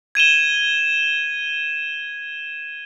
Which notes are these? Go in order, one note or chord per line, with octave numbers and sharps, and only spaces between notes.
G#6 D#7 E7 G7